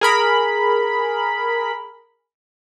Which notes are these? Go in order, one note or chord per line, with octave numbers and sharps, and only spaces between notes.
G#4 A#4 B5